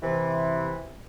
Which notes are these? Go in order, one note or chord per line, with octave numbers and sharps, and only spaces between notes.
C3 E3